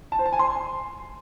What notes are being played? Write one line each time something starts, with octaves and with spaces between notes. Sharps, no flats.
A5
C5
A5
G#5
C6